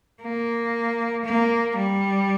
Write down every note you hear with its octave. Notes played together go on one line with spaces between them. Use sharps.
A#3
A#3
G3